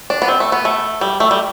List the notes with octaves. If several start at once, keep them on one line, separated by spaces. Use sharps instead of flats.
D4
B3
C4
A3
B3
A3
G3
A3
G3